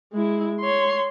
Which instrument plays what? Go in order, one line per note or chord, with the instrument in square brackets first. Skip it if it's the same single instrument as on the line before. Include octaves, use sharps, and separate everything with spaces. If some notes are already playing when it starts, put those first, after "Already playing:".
[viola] G#3 E4
C#5 C6